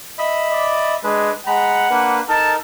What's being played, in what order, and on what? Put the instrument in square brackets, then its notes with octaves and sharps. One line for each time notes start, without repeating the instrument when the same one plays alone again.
[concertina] D#5 E5 B5
[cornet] D5
[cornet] G#3 [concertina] D4 B4
[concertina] G#3 A#5 B5 [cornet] F#5
[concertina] A#3 D4 B4
[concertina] D#4 A4 A#4 [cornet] A5